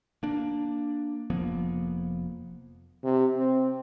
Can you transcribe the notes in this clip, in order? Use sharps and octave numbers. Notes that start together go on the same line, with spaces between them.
A#3 D4
F1 F3 A#3 B3
C3
C4